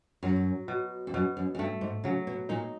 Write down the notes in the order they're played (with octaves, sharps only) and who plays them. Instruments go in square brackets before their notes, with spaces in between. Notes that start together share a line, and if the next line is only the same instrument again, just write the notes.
[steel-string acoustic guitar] F#2 [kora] F#3
[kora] B2
[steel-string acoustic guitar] F2
[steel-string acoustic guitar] F#2 [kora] B2
[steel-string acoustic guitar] F#2
F#2
[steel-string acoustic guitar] G2 [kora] A3
[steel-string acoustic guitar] G#2
[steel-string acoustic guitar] C#3 [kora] F#3
[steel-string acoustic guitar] B2
[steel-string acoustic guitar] A#2 [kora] D#4